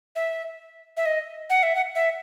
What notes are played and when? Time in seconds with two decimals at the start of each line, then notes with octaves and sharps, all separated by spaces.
0.16 E5
0.97 E5
1.06 D#5
1.50 F#5
1.63 E5
1.75 F#5
1.95 E5